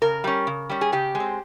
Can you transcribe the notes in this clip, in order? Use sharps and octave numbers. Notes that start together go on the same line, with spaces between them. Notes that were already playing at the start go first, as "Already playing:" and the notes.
C#3 A#4
G3 C#4
C#3
G3 C#4
G#4
C#3 G4
G#3
C4